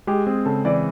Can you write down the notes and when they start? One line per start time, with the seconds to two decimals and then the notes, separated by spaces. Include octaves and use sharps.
0.07 G#3 G4
0.27 C4 G#4
0.46 C#3 A4
0.65 E3 D5